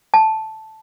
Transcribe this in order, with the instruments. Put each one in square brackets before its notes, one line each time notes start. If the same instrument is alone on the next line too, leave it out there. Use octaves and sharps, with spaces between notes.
[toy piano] A5